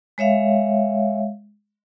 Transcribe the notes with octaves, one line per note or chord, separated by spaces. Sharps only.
G#3 C#5 E5 F5